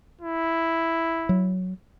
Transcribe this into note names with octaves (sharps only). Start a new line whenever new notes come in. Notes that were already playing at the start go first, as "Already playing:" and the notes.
E4
F#3